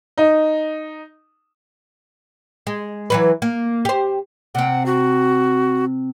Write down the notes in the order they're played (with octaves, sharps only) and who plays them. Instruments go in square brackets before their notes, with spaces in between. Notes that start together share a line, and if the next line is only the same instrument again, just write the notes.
[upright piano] D#4
[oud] G#3
E3 F#3 B4
A#3
G4 C5
[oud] C3 C4 [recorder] F#5
[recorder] F#4